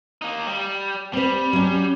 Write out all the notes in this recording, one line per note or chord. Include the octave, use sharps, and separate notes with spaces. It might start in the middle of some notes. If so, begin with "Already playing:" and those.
A#3 D#4
G3
G3 C4 B4
F#3 C#4